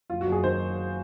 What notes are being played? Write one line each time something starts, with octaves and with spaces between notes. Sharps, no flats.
F#1 F4
F#4
F#1
G#4
D#3 C5